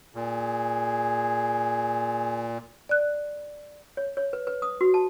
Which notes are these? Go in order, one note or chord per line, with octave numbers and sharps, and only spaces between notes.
A#2 G#4
D5 F#6
C#5
C#5
B4
B4
D#6
F#4
A5